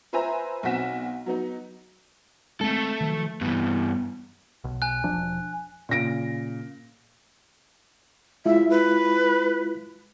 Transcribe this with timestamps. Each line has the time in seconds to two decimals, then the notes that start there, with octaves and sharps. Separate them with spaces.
0.13 F4 B4 C5 E5 G#5 A#5
0.63 B1 F#3 C4 F#5 B6 E7
1.26 F#3 B3 D#4
2.61 G#3 A3 C4 A4
3.00 D#3 F3 F#3
3.41 G2 E3 B3
4.64 B1
4.82 G#5 F#6
5.04 E1 F3 D4
5.89 A#2 C#3 A#6 D7
8.45 G#3 E4 F4 E5
8.70 B4